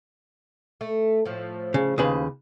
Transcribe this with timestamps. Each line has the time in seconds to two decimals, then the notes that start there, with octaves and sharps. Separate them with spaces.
0.81 A3
1.26 A2 F3
1.74 C#3
1.98 D#2 C#3 B4